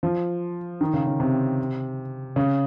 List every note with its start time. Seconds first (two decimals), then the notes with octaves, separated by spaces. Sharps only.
0.03 F3
0.81 D#3
0.93 C#3
1.07 C#3
1.20 C3
2.36 C#3